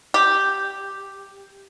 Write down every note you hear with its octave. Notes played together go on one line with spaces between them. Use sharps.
G4